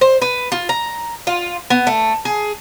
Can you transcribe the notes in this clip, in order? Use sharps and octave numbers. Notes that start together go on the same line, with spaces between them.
C5
B4
F4
A#5
F4
B3
A3
G#4